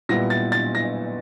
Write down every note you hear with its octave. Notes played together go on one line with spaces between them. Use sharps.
A#2 G3 B3 E4 A#6
A6
A6
A#6